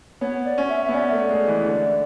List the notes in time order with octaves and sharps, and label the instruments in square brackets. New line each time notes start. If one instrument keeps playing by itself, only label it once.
[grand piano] B3 [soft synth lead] C#5
[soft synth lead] D5
[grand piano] C#4
[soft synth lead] E5
[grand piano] B3 [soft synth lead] E5
[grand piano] C#4 [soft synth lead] D5
[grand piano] A3
G#3
E3
D3